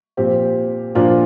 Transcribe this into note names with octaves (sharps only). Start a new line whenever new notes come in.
A#2 F3 C4 G4
A#2 F3 A#3 D4 F4